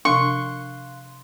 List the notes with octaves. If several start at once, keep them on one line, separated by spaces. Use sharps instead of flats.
C3 F3 D4 F5 C6 C#6 F#6